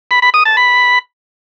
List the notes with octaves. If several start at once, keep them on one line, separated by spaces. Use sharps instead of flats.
B5
B5
D#6
A5
B5